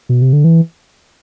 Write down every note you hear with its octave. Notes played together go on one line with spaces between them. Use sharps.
B2
C3
D3
E3